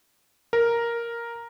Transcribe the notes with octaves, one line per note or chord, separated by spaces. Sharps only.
A#4